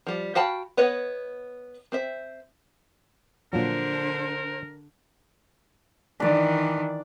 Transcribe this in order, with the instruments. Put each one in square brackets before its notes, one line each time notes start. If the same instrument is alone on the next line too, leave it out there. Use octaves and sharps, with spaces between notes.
[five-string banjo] F3 G3
F#4 F5 G5 A5 B5
B3 B4 C#5 D#5 F#5
C4 C5 E5
[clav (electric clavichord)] A#2 F3 F#3 [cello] D3 D4 [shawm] A#4 [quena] C5
[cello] D#3 E3 [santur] D4 D5